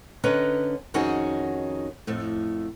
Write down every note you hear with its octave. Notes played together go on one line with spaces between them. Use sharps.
D3 C#4 B4 D#5 A#5
F2 D#3 C#4 D#4 F#4 G#4
F2 A2 A3